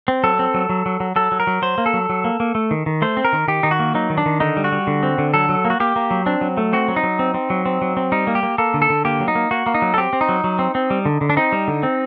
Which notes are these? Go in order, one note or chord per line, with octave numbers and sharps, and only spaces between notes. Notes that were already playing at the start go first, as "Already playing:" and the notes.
C4
F#3 A4
C4
F#3
F#3
F#3
F#3
F#3 A4
F#3
A#4
F#3
F#3 C5
A#3
A4
F#3
F#3
A#3
A#3
A3
D#3
D#3
A3 C5
C4
A#4
D#3
D#3 G4
D#3 D#4
F#4
A#3
F#3 D#4
D#3
D4
D#3
D3 D#4
G3
F#4
G3
D3
C4
D3
F#3 A4
F#3
A#3
F#4
A#3 G4
A#3
F#3
C4 D4
F#3
A3
C4 F#4
F#3
D#4
F#3
C4
C4
F#3
C4
F#3
C4
G3 D#4
A#3
G4
A#3
A#3 A4
D3
A4
D3
A#3 G4
F#3
D#4
A#3
A#3 F#4
A#3
D#4
F#3
A4
C4 G4
C4
D#4
F#3
F#3
C4
C4
G3
D3
D3
D4
C4 D#4
G3
D3
C4